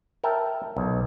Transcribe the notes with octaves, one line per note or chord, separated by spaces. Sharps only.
A#4 E5 G5 A5
B1